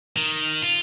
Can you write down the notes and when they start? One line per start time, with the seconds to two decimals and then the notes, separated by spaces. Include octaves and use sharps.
0.16 D#3
0.62 F4